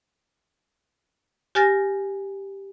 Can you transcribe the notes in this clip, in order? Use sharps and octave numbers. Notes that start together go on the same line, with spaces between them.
G4 G#5 F6 A6 A#6